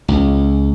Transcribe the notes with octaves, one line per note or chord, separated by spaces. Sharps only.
C#2